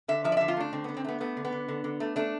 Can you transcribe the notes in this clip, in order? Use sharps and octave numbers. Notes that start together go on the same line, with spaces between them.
D3 E5
F3 E5
D5
D3 E5
F4
A3 D4
D3 C4
D3 B3
C4
A3 B3
A3 B3
D3
B3
D3
D3
D3
A3
A3 D4